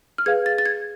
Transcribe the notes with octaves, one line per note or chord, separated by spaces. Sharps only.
F6
G#4 B4 F5 G#6
A6
A6
G#6